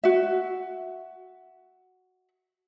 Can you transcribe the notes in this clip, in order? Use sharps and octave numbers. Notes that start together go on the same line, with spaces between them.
F#4 E5